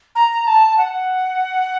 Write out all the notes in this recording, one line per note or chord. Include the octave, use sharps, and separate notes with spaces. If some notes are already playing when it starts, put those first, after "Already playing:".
A#5
A5
F#5